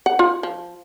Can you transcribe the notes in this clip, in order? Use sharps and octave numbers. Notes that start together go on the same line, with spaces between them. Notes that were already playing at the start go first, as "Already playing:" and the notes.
F#5
F4
F3